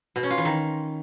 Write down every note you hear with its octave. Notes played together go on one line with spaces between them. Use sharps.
B2
C#4
F4
E3
D#3